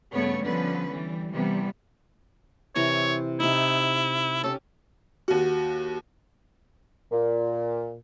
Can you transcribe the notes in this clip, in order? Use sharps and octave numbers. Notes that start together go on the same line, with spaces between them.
G2 C#3 A3 B3 C#5
D3 F3 G3 B3 C#4 B4
E3 G3
C3 E3 G3 B3
C3 E3 C#5 A#5
C3 D#4 E4
C#4 G4 A4
D#2 F#4
A#2